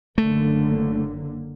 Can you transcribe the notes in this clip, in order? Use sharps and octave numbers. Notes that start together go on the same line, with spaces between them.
F#1 D3 A3 A#3